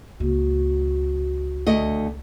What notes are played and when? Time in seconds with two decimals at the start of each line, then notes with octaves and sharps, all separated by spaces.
0.20 C#2 A#3 F#4
1.67 D2 A3 D#5